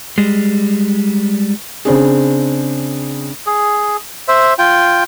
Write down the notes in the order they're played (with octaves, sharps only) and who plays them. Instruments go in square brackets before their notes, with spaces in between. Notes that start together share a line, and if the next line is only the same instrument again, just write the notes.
[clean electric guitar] G3 G#3
[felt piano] C#3 C4 D4 G#4
[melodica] G#4
C5 E5
F4 G5